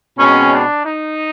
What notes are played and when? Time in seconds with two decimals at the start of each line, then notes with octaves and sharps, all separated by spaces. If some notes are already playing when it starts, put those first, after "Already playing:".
0.18 B2 G#3 C4 C#4
0.52 D4
0.83 D#4